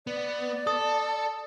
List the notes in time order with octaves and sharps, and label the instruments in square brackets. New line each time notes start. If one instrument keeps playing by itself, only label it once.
[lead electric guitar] B3 [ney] D5
[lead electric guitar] A4 [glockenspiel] D#6